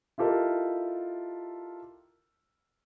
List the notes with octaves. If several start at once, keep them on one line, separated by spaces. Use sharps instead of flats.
E4 F4 G4 A4 A#4 D#5